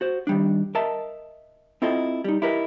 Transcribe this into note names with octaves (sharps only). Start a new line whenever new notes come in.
F#4 C5
D#3 G3 D4
A#4 D#5 E5 A5
C4 E4 F4 A4 D#5
G3 D#4
E4 G4 A#4 B4 D#5